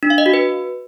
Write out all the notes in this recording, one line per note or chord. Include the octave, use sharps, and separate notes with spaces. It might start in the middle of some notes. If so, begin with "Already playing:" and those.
D4
F5
D#5
F#4
B4